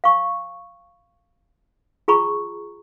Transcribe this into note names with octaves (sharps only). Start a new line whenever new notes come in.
F5 C#6
F4 G#4 A#5 B5 C#6